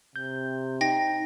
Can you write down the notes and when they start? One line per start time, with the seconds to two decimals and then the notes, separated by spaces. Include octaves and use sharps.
0.16 C3 G6
0.81 D#4 G5 A#6